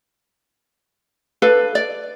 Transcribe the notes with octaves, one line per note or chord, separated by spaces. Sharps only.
D4 A4 B4 F5
D5